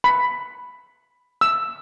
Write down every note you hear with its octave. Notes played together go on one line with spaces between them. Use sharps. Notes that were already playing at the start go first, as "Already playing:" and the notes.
B5
E6